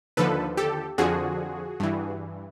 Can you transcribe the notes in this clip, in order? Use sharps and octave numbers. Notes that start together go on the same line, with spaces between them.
D#2 D3 F3 A4 B4
G4 A4
F2 D3 F3 F#4 G#4
G2 E3